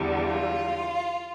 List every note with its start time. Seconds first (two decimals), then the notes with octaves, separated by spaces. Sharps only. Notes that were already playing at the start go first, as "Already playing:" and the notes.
Already playing: E2 D3 G3
0.22 F4